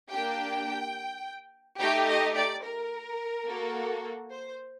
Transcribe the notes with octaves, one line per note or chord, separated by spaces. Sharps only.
A#3 D4 G4 G5
A3 D#4 G4 G5
D#5
D5
A#4
A#3 F#4 A4
C5